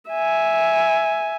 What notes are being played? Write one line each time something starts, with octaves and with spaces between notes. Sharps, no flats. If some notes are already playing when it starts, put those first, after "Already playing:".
E5 G#5